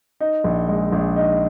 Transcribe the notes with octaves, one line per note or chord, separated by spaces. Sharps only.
D#4
A#1
G#3
A#1
D#4